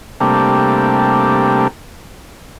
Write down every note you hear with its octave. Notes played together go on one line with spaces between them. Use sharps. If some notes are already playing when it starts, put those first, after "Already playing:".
C3 G3 A3 A#3 D4